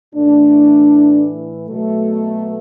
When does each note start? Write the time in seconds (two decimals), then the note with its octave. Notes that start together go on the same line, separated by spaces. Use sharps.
0.14 A2 E3 A3 D4
1.67 B2 F#3 A3